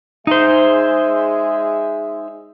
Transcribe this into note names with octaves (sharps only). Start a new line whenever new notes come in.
G#3 D#4 G#4 C5 E5